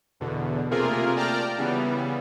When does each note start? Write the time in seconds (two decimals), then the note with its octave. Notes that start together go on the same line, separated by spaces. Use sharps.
0.20 E2 B2 D3
0.71 C3 A3 A#3 F4 G#4 A#4
1.16 D5 G5 A5 A#5 D6 F6
1.58 C#3 E3 G3 B3